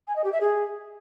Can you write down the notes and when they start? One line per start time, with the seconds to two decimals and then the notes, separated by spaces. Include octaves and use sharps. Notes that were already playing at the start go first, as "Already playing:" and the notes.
0.07 G#5
0.15 D#5
0.24 G4
0.32 E5
0.40 G#4